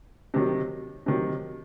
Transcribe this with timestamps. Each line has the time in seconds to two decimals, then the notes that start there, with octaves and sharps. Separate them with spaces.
0.34 C3 D#3 F#3
1.06 C3 D#3 F#3